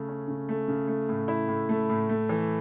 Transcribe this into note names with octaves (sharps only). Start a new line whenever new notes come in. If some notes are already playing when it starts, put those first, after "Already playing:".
Already playing: C#3 A3
C#4
C#3
A3
C#3
A3
A2
E4
A2
A3
A2
A3
E3